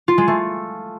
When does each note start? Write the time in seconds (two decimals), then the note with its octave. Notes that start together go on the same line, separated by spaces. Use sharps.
0.08 F4
0.18 G#3
0.27 A3